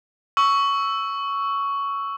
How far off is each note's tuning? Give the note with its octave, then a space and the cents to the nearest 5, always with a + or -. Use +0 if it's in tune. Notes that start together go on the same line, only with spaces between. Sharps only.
C#6 +10 E6 +0